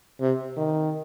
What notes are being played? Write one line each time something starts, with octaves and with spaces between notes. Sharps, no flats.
C3
D#3